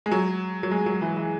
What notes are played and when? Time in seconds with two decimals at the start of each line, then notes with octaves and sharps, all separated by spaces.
0.06 G#3
0.11 F#3
0.63 F#3
0.71 G#3
0.86 F#3
1.01 E3
1.17 E3